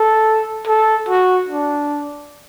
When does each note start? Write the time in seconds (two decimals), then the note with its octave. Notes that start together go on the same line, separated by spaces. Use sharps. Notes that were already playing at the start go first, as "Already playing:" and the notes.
Already playing: A4
0.68 A4
1.09 F#4
1.49 D4